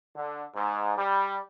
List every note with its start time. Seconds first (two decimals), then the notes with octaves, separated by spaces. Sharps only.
0.16 D3
0.54 G#2
0.97 G3